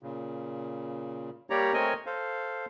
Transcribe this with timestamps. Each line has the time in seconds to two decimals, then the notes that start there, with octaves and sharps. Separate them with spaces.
0.03 A#2 C#3
1.50 G3 A#3 G4 C#5 D5 A#5
1.74 A3 C4 A#4 C#5 D#5 G#5
2.06 A4 C5 F5